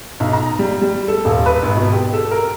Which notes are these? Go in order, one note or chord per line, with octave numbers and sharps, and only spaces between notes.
B1
A#5
G3
G3
A4
D#1
B4
G#1
B2
G4
A4
A#4